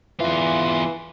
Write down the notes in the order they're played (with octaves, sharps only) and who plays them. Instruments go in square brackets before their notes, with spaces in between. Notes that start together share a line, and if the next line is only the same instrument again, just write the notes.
[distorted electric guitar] E2 F4 [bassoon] E3